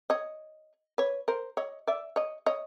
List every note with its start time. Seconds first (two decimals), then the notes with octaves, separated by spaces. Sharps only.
0.10 C#5 D#5
0.98 B4 C#5
1.28 A#4 C5
1.57 C#5 D#5
1.87 D5 E5
2.16 C#5 D#5
2.46 C#5 D#5